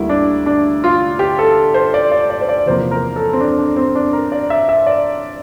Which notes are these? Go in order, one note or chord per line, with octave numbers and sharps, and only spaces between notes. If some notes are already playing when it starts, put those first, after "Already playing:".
Already playing: D2 D3 G3 A#3 E4
D4
D4
F4
G4
A4
C5
D5
D5
D5
C5
D5
E2 C3 F3 A#3 C5
A#4
A4
C4
D4
D4
C4
D4
A#4
D5
E5
E5
D5